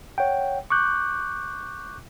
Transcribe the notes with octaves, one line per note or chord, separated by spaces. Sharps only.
C#5 F#5 G5
C#6 D6 F#6 G6